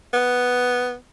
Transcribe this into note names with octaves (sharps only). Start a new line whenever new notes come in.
B3